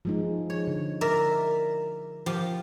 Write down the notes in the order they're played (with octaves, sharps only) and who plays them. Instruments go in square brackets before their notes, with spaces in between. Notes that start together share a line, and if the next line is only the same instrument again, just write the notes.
[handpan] F3 G#3 D#4
[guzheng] C#5
[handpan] D3
[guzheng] A#4 D5 E5
F3 G4